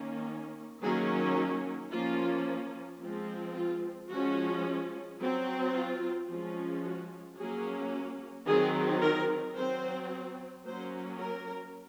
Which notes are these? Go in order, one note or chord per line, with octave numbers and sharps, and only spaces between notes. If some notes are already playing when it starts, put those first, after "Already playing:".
Already playing: D#3 A#3 C#4
D#3 F#3 A#3 C#4 G#4
F3 A#3 C#4 F4
F3 G#3 C4
F4
F3 G#3 C#4 F#4
F#3 C4
F4
F3 G#3 C#4
F#4
F#3 A#3 C#4 G#4
D#3 F#3 C4 G#4
A#4
F#3 C4 C5
F#3 A#3 C#4 C5
A#4